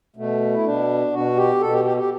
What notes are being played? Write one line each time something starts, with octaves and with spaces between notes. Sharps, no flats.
B2 A3
E4
B2 D4
B2 F#4
G4
B2 A4
G4
G4
G4